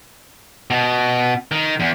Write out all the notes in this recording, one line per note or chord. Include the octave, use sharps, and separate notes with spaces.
B2
D#3
E2